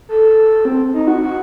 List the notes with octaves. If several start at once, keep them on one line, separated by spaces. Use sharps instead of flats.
A4
C4
D#4
F#4
F#4